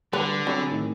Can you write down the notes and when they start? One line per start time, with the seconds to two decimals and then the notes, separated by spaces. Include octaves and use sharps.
0.13 D3 G3 B4
0.47 F#3 C4 G#4 B5
0.71 A2 D#3